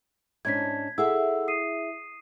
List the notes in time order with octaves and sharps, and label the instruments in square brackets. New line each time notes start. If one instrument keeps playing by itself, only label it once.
[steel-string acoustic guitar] G#2 C#4 D4 [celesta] G#6 B6
[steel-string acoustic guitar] E4 G#4 E5 [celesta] A4 F#5 E6
[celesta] D#6 C7 D#7